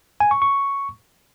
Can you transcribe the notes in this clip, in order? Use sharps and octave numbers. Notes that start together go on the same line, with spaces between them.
G#5
C#6
C#6